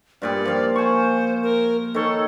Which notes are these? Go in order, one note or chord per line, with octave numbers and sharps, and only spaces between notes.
G2 A#2 G3 D5
F3 F5
C5 G#5 C#6
A#4
D#3 A4 C#5